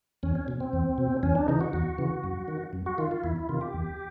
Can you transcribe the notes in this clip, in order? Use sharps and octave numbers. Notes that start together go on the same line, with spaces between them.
E2 C#4
C#4
B2
C4
E2
B2
E2 C#4
D4
C#3 E3 D#4
F#4
E2 F#4
C#3 E3
F#2
D#3
F#2
F#4
D#3 F4
F4
E2 E4
E4
C3 D#3 F4
G4
E2